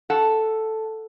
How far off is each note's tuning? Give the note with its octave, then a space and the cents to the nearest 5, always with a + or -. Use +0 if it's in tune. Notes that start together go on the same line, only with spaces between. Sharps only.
A4 +0 F#5 +0